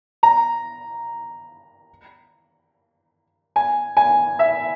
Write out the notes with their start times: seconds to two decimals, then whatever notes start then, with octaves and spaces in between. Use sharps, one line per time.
0.23 A#5
3.56 G#5
3.97 G#5
4.39 E5